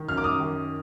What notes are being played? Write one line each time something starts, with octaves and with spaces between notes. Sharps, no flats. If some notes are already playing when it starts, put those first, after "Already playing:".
Already playing: D#3
F#2 F6
D6
D#6
D#3